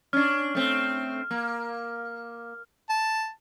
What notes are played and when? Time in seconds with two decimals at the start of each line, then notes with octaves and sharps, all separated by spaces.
0.13 C#4 D4 F6
0.55 A3 C4
1.31 A#3
2.90 A5